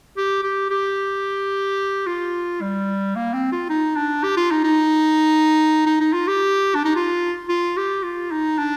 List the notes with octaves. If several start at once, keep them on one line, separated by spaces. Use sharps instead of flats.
G4
G4
G4
F4
G3
A#3
C4
F4
D#4
D4
G4
F4
D#4
D#4
D#4
D#4
F4
G4
D4
D#4
F4
F4
G4
F4
D#4
D4